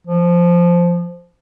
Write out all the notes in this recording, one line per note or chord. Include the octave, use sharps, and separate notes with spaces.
F3